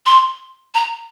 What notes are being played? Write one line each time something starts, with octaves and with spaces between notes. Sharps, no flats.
C6
A#5